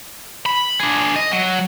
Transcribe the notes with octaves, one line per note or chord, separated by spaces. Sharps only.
B5
D4 G#4
D#5
F#3